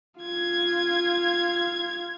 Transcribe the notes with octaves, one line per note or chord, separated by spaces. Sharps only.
F4 G#6